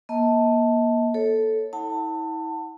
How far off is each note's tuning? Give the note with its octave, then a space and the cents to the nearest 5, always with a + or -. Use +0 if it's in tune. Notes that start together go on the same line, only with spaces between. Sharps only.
A#3 +30 D#5 +45 A5 +0
A4 -5 C#5 -5
E4 -40 F#5 +0 A5 +25